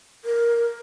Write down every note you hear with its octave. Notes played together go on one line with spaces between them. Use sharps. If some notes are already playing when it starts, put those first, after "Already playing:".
A#4